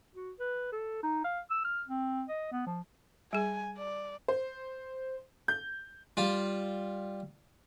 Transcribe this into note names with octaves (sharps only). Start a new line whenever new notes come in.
F#4
B4
A4
D#4
F5
E6
F6
C4
D#5
B3
F3
G3 G#4 G#5
D5
C5
G6
G3 F4